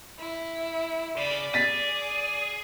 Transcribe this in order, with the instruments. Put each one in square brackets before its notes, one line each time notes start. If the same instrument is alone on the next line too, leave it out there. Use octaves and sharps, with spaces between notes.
[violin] E4
[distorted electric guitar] C#3 [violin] D5 B5
[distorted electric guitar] G#4 [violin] D5 [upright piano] A6 B6